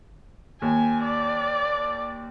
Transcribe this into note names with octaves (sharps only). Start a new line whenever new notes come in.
D#2 G#5
D5